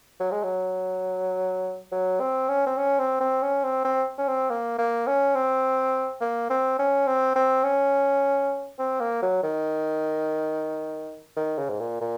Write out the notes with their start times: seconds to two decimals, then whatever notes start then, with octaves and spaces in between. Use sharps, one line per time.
0.20 F#3
0.32 G#3
0.43 F#3
1.92 F#3
2.20 C4
2.49 C#4
2.66 C4
2.77 C#4
2.99 C4
3.20 C4
3.43 C#4
3.64 C4
3.85 C4
4.18 C#4
4.28 C4
4.50 A#3
4.78 A#3
5.07 C#4
5.35 C4
6.21 A#3
6.50 C4
6.79 C#4
7.07 C4
7.36 C4
7.64 C#4
8.79 C4
9.00 A#3
9.22 F#3
9.43 D#3
11.37 D#3
11.58 C#3
11.69 G#2
11.80 A#2
12.01 A#2